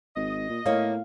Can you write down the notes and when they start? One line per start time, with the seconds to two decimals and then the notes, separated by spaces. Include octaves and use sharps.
0.16 G#1 D#5
0.49 A#2
0.66 A2 A#3 C#5 F5